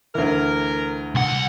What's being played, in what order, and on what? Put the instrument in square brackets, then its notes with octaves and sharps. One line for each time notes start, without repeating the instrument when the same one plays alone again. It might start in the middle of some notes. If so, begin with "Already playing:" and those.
[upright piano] D2 E3 [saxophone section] A#4
[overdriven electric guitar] C2 F#5